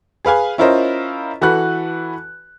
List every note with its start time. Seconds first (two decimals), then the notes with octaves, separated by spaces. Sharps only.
0.25 G#4 B4 F5 G#5
0.58 C#4 E4 F4 A#4 C5 D#5
1.41 E3 F#4 A4 B4 F#6